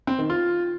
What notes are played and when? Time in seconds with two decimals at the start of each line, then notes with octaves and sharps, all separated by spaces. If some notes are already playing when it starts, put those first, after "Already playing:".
0.07 C4
0.19 D#3
0.30 F4